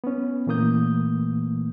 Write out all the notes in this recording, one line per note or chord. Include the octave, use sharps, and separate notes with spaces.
B3 C#4
A#2 E3 A3 A#3 D#6 G6